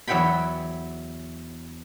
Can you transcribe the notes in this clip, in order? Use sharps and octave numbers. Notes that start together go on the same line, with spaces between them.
E2 F#3 E4 F#5 G5 B5